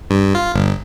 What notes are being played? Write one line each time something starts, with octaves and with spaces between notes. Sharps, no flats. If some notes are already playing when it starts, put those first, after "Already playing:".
G2
F4
G1